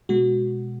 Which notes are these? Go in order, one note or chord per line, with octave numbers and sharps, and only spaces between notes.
B2 G#3 F#4